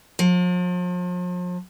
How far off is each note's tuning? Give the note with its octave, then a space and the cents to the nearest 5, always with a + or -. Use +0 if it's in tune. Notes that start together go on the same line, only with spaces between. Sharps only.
F3 +40